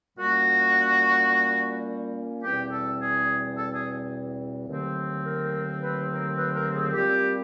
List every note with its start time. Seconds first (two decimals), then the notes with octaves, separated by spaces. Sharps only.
0.18 A#2 G3 A#3 C#4 F#4
2.43 E2 B2 G3 C4 G4
2.71 A4
2.99 G#4
3.55 A4
3.74 G#4
4.68 D#2 D3 F#3 A3 C4
5.24 A#4
5.80 B4
6.08 A#4
6.36 B4
6.55 A#4
6.74 G#4
6.92 A#2 G3 C4 G4